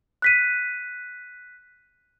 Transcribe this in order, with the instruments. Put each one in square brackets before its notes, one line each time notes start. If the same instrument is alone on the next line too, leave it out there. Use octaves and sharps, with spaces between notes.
[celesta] F#6 B6 D#7